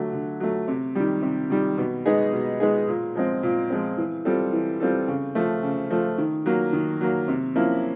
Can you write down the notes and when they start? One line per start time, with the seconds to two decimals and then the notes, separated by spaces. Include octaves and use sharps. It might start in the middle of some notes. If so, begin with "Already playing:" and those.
Already playing: D3 F#3 A3
0.13 D3
0.40 F#3 A3
0.68 C3
0.95 D#3 G3
1.22 C3
1.50 D#3 G3
1.78 B2
2.06 G#3 B3 D#4 G#4
2.33 B2
2.60 G#3 B3 D#4 G#4
2.88 A#2
3.15 F3 G#3 C4
3.43 A#2
3.70 F3 G#3 C4
3.98 E3
4.25 G3 C4 F4 A4
4.53 E3
4.80 G3 C4 F4 A4
5.08 C#3
5.35 F3 A3
5.63 C#3
5.91 F3 A3
6.18 D#3
6.46 F#3 A#3
6.73 D#3
7.01 F#3 A#3
7.28 C3
7.56 F3 A#3 C#4 E4